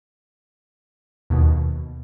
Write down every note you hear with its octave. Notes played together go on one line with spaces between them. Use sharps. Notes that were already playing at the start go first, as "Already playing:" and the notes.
D#2 B2